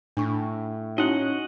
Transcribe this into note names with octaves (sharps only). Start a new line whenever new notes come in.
A2 D4 C#6
C#4 D#4 E4 F#4 D#5 F#5